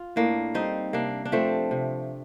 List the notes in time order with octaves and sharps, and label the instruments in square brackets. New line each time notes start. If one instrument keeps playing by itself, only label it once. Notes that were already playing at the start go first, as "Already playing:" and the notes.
Already playing: [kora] F4
A2 A#3 D4
G3 C4 D#4
C3 A#3 D4
D4
F3 A3 C4
C3